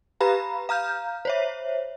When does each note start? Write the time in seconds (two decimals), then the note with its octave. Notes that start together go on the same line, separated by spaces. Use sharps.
0.20 G4 B4 F5 A#5 B5
0.69 F5 A#5 F6 G6
1.25 C5 C#5 E5